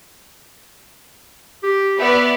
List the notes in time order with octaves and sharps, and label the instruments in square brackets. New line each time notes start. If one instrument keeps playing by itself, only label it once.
[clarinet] G4
[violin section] B3 D5 [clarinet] E5